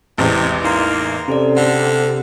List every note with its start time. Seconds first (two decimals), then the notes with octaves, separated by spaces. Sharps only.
0.18 A1 E2 C3 G#3
0.64 A#3 D#4 A#5 C6
1.28 C3 C#4 A4 D5
1.57 D3 C4 F#5